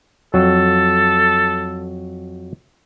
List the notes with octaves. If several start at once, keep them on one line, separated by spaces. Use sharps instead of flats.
F2 F#3 A4